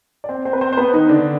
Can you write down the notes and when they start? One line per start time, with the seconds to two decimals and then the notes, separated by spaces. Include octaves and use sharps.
0.24 D5
0.29 C4 C5
0.45 C4 C5
0.53 B4
0.61 C4 C5
0.72 C5
0.77 B3 B4
0.93 D#3 D#4
1.09 D3 D4